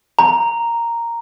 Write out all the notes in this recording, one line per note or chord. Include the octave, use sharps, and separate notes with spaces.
A#5